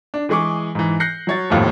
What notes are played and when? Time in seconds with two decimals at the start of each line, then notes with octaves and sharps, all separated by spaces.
0.14 D4
0.29 E3 G#3 G#4 C#6 D6
0.75 G#2 E3
1.00 F#6 G6 A#6 C7 C#7
1.27 F#3 C#5 A6
1.50 G#1 D#2 A2 F3